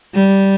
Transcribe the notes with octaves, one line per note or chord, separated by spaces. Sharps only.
G3